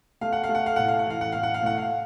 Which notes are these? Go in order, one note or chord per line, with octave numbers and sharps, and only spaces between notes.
A3 F5
F#5
F5
A3
F#5
F5
A2 F#5
F5
F#5
E3 F5
F#5
A2 F5
F#5
F5
A2 F#5
F5